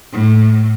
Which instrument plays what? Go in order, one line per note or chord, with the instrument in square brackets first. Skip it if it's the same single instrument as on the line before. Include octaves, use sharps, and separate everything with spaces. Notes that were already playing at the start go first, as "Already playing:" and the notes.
[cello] A2